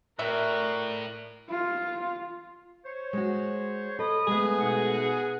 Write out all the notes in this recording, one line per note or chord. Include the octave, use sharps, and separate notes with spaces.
A2 F#4 A#4 D5 E5
F4
C5 C#5
G#3 F#4
A4 D#5 B5 D#6
G#3 A3 B3 G#4
B2 D#4 F#5